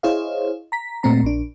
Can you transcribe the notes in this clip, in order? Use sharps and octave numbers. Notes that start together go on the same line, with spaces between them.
E4 G#4 C5 C#5 D#5 F5
A#5 B6
A#2 A3 C4 A#5
A#1 D4